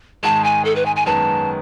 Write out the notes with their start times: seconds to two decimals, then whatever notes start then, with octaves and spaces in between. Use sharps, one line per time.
0.23 G#2 D#3 G#3 A5
0.44 G#5
0.65 A4
0.76 B4
0.86 G#5
0.96 G#5
1.06 F#2 D#3 G#3 B3 A5